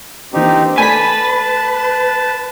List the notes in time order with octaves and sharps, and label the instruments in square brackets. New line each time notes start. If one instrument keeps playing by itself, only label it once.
[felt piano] E3 A#3 D4 [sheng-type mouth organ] C4 D#4 G4
[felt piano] A3 A4 D5 [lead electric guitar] B4 [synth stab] G#5 B6 [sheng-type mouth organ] A5